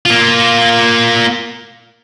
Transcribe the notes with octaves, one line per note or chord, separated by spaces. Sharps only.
A#3 F4